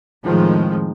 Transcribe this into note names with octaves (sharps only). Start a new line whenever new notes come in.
F2 A2 D#3 F3 G#3